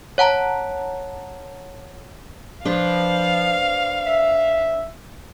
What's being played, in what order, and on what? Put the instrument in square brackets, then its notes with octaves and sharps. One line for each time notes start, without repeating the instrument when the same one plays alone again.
[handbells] C#5 F#5 A5 A#5
[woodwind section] F3 [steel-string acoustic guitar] D4 B4 C5 [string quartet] F5
[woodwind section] E5